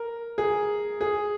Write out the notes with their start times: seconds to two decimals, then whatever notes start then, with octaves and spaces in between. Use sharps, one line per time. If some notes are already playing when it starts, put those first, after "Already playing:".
Already playing: A#4
0.38 G#4
1.01 G#4